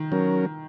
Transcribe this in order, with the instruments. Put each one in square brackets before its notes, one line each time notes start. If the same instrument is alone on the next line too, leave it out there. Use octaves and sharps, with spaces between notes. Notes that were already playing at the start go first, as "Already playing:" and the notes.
Already playing: [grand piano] D#3
[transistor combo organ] F#3 C#4 A#4